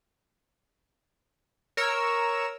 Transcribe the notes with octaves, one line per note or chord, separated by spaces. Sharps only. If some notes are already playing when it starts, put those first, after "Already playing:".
A#4 C#5 E6